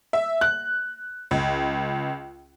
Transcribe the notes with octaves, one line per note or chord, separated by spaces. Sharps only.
E5
F#6
C#2